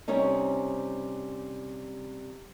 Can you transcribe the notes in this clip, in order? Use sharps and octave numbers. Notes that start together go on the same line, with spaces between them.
C3 G3 C4 C#4 D#4